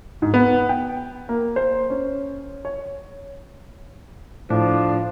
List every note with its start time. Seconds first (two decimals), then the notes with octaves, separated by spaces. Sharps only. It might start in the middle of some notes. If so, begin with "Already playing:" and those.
0.22 G#2
0.34 B3
0.69 G5
1.29 A#3
1.56 C5
1.90 C#4
2.65 C#5
4.50 A2 F3 D4